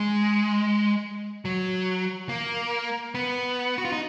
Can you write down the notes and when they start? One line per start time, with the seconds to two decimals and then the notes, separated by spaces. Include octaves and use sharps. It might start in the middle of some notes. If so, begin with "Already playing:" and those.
Already playing: G#3
1.45 F#3
2.29 A#3
3.15 B3
3.78 F#4
3.85 F4
3.92 D#4